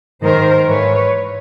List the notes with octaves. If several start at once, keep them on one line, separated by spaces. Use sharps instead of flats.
G#2 D#3 A#4 C5
G#2 E3 B4 C#5